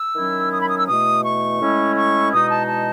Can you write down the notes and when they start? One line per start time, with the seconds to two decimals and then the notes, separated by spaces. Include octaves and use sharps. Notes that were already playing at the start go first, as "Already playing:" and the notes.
Already playing: E6
0.16 D#3 F#3 C#4 E4
0.52 D#6
0.60 B5
0.69 D#6
0.79 E6
0.87 E2 B2 A3 D#6
1.24 C#6
1.60 A2 G#3 C#4 E4
1.96 C#6
2.32 E2 B2 G#3 D#4 D#6
2.50 A5
2.67 A5